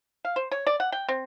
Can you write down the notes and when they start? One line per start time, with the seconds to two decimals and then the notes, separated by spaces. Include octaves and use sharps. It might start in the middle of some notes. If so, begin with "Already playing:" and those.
0.25 F5
0.36 C5
0.51 C#5
0.67 D5
0.80 F#5
0.92 G5
1.08 C4